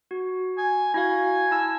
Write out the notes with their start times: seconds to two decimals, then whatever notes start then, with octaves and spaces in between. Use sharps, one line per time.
0.11 F#4
0.58 G#5
0.94 E4 F#4 F5 G#5
1.51 E4 A5 E6